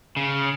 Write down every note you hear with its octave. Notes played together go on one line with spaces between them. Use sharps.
C#3